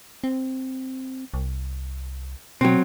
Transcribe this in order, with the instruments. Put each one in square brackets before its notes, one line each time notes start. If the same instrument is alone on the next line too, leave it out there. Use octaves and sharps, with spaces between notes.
[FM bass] C4
C2
[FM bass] B2 [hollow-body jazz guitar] F#3 C4